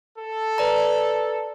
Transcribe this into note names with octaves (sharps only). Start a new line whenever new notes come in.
A4
B4 D5 A#5